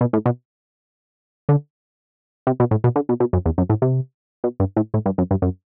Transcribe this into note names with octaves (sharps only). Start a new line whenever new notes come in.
B2
A2
B2
D3
C3
B2
A2
B2
D3
B2
B2
F#2
E2
F#2
A2
C3
B2
G2
A2
A2
G2
F#2
G2
F#2